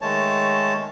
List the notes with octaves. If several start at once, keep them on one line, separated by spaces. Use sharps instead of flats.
D#3 G#3 A3 C#5 A5